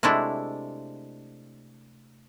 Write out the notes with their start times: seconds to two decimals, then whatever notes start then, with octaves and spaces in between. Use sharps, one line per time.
0.03 C3 G#3 A3 D4 E4